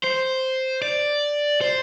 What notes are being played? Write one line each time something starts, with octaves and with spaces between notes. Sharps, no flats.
C5
D5
C5